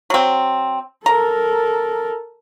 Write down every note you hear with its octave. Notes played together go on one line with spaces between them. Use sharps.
F#3 C4
A4 A#4 A#5